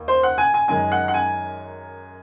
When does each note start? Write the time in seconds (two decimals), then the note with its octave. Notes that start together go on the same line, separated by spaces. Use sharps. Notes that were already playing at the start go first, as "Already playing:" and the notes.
Already playing: D#2
0.08 C5
0.23 F#5
0.38 G#5
0.54 G#5
0.68 F#2 D#3 G#3 G#5
0.92 F#5
1.08 F#5
1.14 G#5